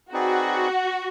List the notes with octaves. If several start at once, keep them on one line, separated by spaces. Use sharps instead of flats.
C4 D#4 F#4 G#4 B4 D5